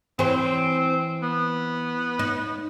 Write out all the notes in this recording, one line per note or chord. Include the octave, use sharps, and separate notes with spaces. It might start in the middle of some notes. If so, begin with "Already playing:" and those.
E3 C4 C5
B3
D#4